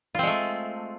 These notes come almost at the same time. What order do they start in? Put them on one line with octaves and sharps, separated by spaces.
F4 C4 G#3 A3